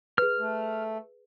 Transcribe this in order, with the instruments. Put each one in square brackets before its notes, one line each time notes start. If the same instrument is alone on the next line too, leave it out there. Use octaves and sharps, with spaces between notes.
[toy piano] G#4 B4 [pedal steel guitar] F6
[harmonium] A3